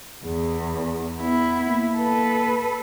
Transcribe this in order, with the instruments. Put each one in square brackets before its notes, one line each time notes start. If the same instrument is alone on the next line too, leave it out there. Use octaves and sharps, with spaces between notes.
[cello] E2 [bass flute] G#4
[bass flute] B3 [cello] E4
[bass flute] A#3
[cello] A4 B4